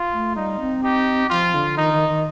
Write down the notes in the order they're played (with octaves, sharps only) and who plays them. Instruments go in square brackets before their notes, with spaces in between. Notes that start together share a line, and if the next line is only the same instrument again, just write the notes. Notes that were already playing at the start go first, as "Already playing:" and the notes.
Already playing: [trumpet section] F4
[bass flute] A3
[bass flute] G3 [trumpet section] D#4
[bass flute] C4
[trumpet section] D#4 G4
[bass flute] F3 [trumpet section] F4
[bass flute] D3
[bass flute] D#3 [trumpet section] D#4
[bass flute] D#3
D#3